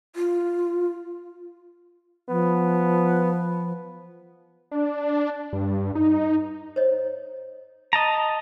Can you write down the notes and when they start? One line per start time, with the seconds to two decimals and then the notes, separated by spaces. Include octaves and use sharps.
0.16 F4
2.29 F3 B3
4.72 D4
5.53 G2
5.95 D#4
6.76 C5 C#5 D#5
7.93 D#5 A5 A#5